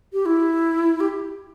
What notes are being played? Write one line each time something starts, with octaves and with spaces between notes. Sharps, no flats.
G4
E4
G4